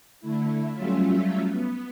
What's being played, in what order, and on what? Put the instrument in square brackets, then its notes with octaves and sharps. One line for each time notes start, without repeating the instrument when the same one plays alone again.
[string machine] D3 A3 E4
F#3 G3 A3 C#4 F4 E5
B3